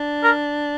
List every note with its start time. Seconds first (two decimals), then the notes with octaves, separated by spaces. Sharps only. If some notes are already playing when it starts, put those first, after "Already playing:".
Already playing: D4
0.24 A#4